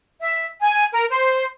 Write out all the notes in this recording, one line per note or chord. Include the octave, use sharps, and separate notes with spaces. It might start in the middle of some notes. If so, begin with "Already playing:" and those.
E5
G#5
A#4
C5